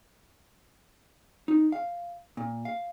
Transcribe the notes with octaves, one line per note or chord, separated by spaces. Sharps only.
D#4
F5
A#2
F5